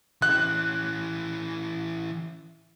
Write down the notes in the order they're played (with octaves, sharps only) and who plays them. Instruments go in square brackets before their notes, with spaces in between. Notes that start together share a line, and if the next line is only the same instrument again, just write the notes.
[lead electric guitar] E3 C#4 [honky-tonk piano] F#6